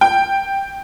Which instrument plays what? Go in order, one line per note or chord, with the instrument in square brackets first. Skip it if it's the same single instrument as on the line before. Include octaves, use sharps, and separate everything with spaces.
[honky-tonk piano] G5